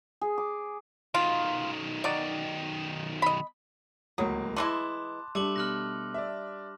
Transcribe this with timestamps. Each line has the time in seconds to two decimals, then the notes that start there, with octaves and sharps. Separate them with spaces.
0.21 G#4
0.38 D6
1.15 B1 D#3 F4
2.04 D#4 F#4 D5
3.22 D#5 B5
4.18 D1 C#2 F#3 A#3 D#6
4.56 E3 G#3 E4 A5 C6 D6 F#6
5.35 G3 A3 D4 A5 D6 F#7
5.56 B2 F6 F#6 A#6 F#7
6.14 D5 E5